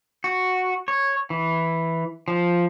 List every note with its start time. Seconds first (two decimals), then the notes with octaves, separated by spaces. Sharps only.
0.24 F#4
0.88 C#5
1.30 E3
2.28 F3